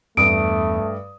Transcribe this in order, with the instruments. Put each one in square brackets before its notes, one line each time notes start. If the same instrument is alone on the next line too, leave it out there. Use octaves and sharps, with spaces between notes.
[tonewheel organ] E2 [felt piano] G2 D#6 [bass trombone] A3 [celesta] D7